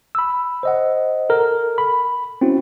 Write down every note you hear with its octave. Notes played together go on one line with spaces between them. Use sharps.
B5 E6
C5 D#5 F#5
A4 A#4
B5
C4 C#4 E4 F#4